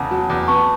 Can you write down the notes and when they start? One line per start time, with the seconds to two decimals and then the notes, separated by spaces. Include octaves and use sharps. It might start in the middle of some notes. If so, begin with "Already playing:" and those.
Already playing: E2 C#3 F#5 A5
0.11 F#3
0.30 E2
0.47 B3 A5 C#6